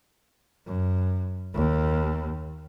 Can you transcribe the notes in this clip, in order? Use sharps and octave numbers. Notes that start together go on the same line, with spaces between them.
F#2
D#2